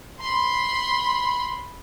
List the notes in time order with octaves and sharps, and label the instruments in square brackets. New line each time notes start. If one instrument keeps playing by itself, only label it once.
[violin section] B5 C6